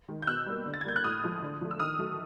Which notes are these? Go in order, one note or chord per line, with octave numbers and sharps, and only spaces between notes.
D#3 G#3
G6
B2 E6 F#6
G3 A#3
D3
A6
G#6
G3 A#3 G6
F#6
A2 D#6 F6
F3 G#3
D3
F3 A3
E6
D#3 D#6 F6
F#3 A3